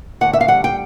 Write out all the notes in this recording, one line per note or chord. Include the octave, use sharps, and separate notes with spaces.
D2 F#5
E5
F5
G3 F#5
G5